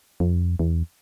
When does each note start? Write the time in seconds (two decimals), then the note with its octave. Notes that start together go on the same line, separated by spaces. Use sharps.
0.20 F2
0.59 E2